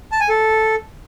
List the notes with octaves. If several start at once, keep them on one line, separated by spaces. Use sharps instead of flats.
A5
G#5
A4